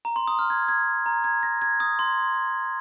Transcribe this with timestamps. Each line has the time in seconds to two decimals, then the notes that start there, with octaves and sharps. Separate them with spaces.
0.05 A#5
0.16 C6
0.28 D#6
0.39 F6
0.50 G#6
0.69 G#6
1.06 A#5
1.24 G#6
1.43 A#6
1.62 G#6
1.80 D#6
1.99 C6